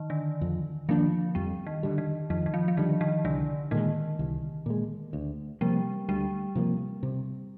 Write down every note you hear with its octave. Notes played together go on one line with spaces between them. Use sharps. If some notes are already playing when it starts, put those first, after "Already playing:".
Already playing: D#3
D3
F2
D#3 F3 A#3 D4
F2 G3
D#3
D3 G3
D#3
F2 D#3
D#3
F3
F3
D3 D#3 G3
D#3
C2 D3
A#2 D#3 G#3
C2
A#2 G#3
D2
C3 F3 G3 A#3
D2 G3
C3 F3 A#3
C3